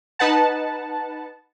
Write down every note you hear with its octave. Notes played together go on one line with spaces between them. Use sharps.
D#4 B4 F#5 A5